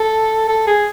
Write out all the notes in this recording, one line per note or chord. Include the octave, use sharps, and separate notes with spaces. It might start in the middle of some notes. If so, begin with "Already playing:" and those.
Already playing: A4
A4
G#4